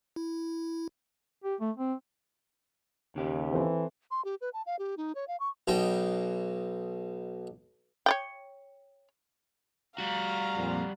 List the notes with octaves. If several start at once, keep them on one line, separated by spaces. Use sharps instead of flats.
E4
G4
A3
C4
D#2 C#3 G4
E3 C4 A4 C5
C6
G4
B4
A5
F5
G4
D#4
C#5
F5
C#6
B1 B2 D#4 G5
C#5 D5 G5
G3 F#4 F5 A#5
F2 A#2